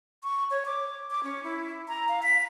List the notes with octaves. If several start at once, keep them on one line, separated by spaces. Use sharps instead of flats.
C#6
C#5
D6
D6
C#4
E4
A#5
F5
B6